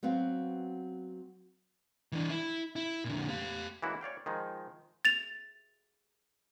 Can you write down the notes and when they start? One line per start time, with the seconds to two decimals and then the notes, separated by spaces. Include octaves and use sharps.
0.03 F#3 B3 C4 F#4 F5
2.12 E3 D4
2.30 E4
2.76 E4
3.05 A#2 D3
3.29 G4 F5
3.82 E3 G#3 A#3 C#4 E4 F#4
4.01 C#5 D5 F5 G5
4.26 D#3 F3 G#3 D#4
5.05 A6 F7